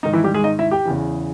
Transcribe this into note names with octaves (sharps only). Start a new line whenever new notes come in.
G#2 D#3 D#4
E3 E4
G3 G4
G#3 G#4
D#4 D#5
E4 E5
G4 G5
E2 C#3 E3